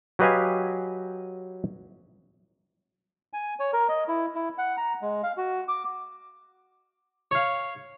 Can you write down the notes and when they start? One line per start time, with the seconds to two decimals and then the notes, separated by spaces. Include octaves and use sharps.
0.19 F#3 G4 B4 D#5 F5 G#5
3.33 G#5
3.60 C#5
3.73 A#4
3.89 D#5
4.08 E4
4.35 E4
4.58 F#5
4.77 A#5
5.02 G#3
5.23 F5
5.37 F#4
5.68 D6
7.31 C#5 F5